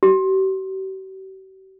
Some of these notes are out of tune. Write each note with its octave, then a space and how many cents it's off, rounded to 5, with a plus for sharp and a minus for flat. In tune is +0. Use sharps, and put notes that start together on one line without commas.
G4 -45